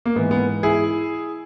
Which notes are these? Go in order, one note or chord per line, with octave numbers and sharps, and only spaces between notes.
A#3
G#2 E3 B3
B3
E4 G#4